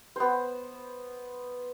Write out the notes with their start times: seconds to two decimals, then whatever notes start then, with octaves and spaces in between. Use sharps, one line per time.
0.16 B3 C5